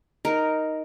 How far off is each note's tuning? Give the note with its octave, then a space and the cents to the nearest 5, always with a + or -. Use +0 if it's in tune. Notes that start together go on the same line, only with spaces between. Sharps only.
D#4 +5 A#4 +0